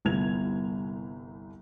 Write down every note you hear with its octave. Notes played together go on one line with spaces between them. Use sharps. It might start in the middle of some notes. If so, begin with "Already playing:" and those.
G1 C2 B3 G#6 F7